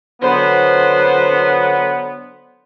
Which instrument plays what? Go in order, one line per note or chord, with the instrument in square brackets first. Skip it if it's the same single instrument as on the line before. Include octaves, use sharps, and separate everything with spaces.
[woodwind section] D3 F#3 B3 [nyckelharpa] C5